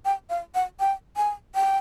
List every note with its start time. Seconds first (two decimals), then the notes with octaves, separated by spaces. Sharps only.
0.05 G5
0.30 F5
0.55 F#5
0.80 G5
1.17 G#5
1.55 G5